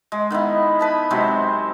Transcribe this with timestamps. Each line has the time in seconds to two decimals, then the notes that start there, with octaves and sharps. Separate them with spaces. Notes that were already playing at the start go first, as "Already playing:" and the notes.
0.12 G#3
0.31 D#3 B3 D#4 E4
0.79 B4 A5 B5
1.11 C3 F#3 G#3 C4